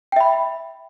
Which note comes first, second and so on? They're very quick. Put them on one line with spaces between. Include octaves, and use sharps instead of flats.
G5 E5 B5